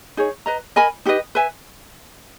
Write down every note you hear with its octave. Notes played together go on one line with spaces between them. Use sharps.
D#4 G#4 C#5
B4 D#5 A#5
A#4 D#5 G#5 B5
D#4 G4 B4 D#5
B4 E5 G#5